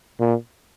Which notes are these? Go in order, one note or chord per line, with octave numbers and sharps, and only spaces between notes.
A#2